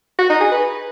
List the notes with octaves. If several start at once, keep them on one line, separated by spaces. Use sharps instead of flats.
F#4
D#4
G#4
B4